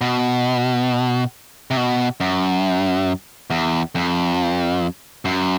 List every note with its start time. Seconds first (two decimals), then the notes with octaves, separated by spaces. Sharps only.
0.01 B2
1.71 C3
1.77 B2
2.20 F#2
3.50 E2
3.95 F2
5.25 F#2